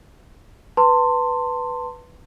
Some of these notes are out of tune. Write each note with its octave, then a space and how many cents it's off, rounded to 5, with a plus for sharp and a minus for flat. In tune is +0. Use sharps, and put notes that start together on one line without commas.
B4 +0 A5 +30 C6 +0